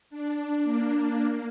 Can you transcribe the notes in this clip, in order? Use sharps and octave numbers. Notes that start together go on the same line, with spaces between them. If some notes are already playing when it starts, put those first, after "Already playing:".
D4
A#3
A#3